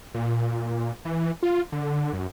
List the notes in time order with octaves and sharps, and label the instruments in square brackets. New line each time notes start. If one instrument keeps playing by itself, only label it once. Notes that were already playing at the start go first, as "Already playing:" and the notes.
[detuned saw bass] A#2
E3
F4
D3
F#2